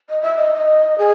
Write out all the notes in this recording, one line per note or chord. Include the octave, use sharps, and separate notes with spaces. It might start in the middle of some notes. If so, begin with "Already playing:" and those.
D#5
E5
D#5
D#5
G#4